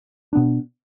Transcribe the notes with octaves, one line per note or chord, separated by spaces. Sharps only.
B2 B3 D4